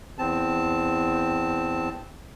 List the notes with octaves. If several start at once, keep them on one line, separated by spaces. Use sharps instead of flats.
E2 C4 A5